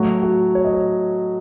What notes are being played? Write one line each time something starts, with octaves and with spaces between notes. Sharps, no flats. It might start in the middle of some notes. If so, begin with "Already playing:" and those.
Already playing: A2 F#3 A3 F#4
F#4
C#5
D#5
C#5